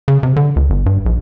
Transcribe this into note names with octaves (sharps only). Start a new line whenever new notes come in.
C#3
C3
D3
C#2
G1
G2
A#1